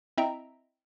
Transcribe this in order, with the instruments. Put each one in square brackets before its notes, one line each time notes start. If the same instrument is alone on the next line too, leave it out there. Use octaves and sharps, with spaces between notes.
[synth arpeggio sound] C4 E4 D#5 E5 G5 A#5